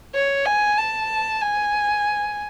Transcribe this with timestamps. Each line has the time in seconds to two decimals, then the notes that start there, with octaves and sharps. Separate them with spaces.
0.15 C#5
0.46 G#5
0.77 A5
1.41 G#5